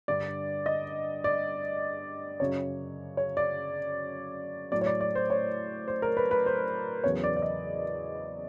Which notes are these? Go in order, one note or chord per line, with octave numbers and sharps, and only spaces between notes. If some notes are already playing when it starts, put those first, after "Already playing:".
G2 D3 G3 D5
D#5
D5
F#2 C#3 F#3 C#5
C#5
D5
A2 F#3 A3 D5
C#5
D5
D5
C5
C#5
C5
A#4
B4
B4
C5
E2 C#3 F#3 B3 C#5
D5
D5
D#5